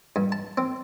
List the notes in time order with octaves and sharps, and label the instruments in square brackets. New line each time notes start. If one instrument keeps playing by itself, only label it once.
[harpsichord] G2
A5
C4